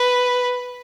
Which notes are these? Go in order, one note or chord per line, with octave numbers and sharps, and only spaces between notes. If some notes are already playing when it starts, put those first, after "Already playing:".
Already playing: B4